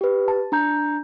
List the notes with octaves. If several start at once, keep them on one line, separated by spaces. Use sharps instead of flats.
G4 B4
A5
D4 A#5 G6